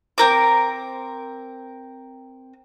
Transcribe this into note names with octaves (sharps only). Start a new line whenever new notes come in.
C4 A#4 D6